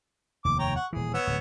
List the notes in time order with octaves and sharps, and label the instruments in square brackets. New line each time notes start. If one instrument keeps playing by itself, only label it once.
[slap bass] F1 D#2 [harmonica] D6
[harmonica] C#5 G5 A#5
F#5 C#6
[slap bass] D#1 E3 [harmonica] G#4
[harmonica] B3 C#5 E6
[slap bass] D1